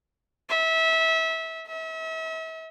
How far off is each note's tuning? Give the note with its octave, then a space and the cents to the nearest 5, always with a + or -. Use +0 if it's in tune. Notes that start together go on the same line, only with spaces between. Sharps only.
E5 -25
E5 -40